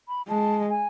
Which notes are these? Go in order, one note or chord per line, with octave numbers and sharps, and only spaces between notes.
B5
G#3 A5
G#5